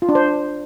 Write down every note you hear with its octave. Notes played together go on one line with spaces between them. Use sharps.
F4
D4
C5